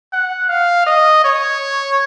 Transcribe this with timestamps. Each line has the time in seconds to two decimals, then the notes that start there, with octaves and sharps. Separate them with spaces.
0.13 F#5
0.49 F5
0.87 D#5
1.24 C#5